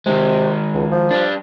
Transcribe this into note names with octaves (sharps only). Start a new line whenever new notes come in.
C3 D#3 G#3
C#2
F3
G3 D4